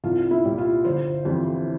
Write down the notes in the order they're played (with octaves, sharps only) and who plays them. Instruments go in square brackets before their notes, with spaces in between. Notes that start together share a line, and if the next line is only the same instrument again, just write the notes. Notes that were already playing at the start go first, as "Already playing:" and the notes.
[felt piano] C2 F4
E4
A#2 G3
F4
G1 C5
F2 E3 G3